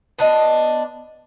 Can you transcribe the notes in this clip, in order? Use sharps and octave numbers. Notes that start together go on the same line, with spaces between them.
B3 D4 D#5